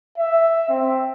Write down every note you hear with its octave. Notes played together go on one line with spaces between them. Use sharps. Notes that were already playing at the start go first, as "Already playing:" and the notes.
E5
C4